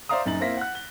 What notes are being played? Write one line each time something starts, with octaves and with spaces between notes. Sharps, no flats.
C5 D5 E5 F5 A#5 D#6
F#1 F#2 D#4 A#5 A6 F#7
A#3 C4 E4 A#6 B6
F#5 F#6
G7